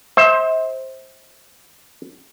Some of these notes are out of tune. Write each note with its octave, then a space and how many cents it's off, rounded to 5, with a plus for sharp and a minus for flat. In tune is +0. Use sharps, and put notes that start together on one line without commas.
C5 +15 E5 -40